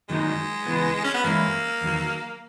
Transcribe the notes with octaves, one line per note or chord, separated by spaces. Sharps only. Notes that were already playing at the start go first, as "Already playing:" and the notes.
F#2 D#3 F#3 G#3 A#3 D#4
C#2 C#3 E3 B3
C#4
B3
F#2 E3 G#3 A#3 C#4 E4
E2 D#3 F#3